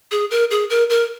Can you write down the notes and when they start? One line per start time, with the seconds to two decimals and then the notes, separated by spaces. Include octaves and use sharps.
0.11 G#4
0.31 A#4
0.51 G#4
0.70 A#4
0.90 A#4